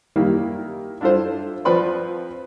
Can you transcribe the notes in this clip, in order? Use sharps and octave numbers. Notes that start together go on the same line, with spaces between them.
D#3 G3 A#3 E4
D4 E4 F4 A4 C5
F3 C4 B4 D5 B5 C6